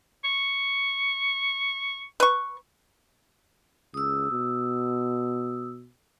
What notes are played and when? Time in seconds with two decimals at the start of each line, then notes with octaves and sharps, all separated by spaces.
0.25 C#6
2.20 B4 C#6
3.94 C#2 D#6 E6
4.31 B2